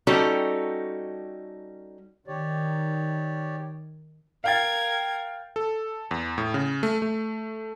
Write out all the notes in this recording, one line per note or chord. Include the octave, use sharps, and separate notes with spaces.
G3 C#4 D#4 F#4 G4 A4
D#3 G4 C#5 D5
A#4 F5 G5 G#6 A6
A4
E2
A2
C#3
A3
A3